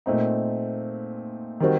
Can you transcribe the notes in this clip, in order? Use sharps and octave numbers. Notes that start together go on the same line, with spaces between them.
A#2 A3 C4 D#4
D#3 G3 C4 F#4